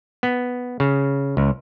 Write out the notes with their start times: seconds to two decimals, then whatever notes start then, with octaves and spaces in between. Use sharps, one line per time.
0.23 B3
0.80 C#3
1.37 C#2